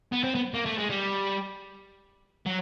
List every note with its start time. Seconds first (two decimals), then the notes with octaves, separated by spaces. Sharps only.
0.12 B3
0.24 C4
0.35 B3
0.54 A#3
0.66 A3
0.78 G#3
0.90 G3
2.46 F#3